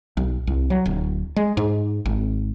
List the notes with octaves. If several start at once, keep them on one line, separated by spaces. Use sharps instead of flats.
B1
C2
F#3
D1
G#3
G#2
G#1